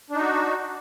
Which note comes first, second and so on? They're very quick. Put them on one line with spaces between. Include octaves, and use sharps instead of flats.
D4 D#4 F#4